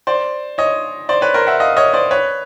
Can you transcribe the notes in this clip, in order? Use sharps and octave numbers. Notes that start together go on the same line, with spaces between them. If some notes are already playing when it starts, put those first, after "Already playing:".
C5 D5
C#5 D#5
C5 D5
B4 C#5
A#4 C5
E5 F#5
D#5 F5
C#5 D#5
C5 D5
B4 C#5